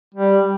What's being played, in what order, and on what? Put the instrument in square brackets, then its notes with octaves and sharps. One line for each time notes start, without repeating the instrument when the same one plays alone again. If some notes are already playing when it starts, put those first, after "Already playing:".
[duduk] G3